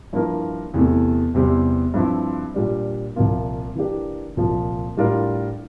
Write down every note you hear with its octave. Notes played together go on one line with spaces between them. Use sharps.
G2 F3 A#3 E4 A#4
E2 C3 E3 A3
E2 C3 G3 C4
G2 F3 C4 E4
A#2 G3 D4
C2 A#2 F3 A#3 F4
E3 A#3 D4 G4
C2 A#2 F3
A2 G3 D4 F4 A#4